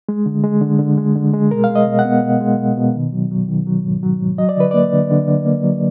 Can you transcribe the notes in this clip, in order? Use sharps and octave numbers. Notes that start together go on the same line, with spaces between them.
G#3
D3
G#3
D3
D3
G#3
D3
G#3
B2 A#4
F5
G#3
D#5
B2
F#5
B3
B2
G#3
B2
B2
D#3
F#3
F#3
D#3
F#3
G#2
F#3
G#2
F#3 D#5
D5
D3 B4
A#3 D5
D3
D3
D3
A#3
F#3